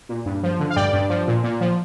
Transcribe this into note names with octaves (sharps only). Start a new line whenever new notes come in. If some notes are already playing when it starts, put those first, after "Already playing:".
A#2
G2
F3
D3
F5
G2 D5 G5
G2
F3
A#2
A#2
F3